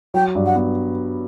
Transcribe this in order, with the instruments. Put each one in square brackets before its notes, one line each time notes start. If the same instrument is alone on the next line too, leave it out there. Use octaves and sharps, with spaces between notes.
[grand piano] F#3 [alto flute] G5
[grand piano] G2
[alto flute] F#5
[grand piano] B3